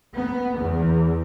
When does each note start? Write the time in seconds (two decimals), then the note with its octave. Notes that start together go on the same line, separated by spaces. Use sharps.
0.14 B3
0.58 E2